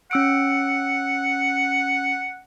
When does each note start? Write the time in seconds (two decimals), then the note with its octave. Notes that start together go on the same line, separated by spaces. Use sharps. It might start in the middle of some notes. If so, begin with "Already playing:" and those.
0.11 C#4 F#5 E6 D7